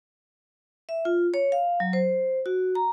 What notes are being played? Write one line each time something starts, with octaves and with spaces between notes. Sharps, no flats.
E5
F4
C#5
F5
F#3
C5
F#4
A#5